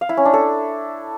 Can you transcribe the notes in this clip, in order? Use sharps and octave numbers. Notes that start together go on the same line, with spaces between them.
F5
E4
C#4
D4
A4